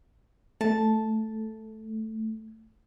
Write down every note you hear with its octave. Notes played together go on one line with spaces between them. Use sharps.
A3 A5